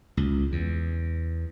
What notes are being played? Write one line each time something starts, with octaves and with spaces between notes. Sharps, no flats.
C#2
E2